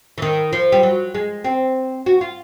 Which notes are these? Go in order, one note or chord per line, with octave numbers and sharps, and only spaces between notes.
E3
D#3
F3
G3
F#3
G#3
C4
F#4
F4